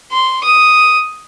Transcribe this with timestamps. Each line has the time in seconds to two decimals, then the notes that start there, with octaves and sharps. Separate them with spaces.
0.12 C6
0.44 D#6